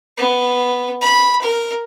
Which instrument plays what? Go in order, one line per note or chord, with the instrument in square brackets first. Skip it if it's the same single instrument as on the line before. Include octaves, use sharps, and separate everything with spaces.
[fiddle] B3
B5
A#4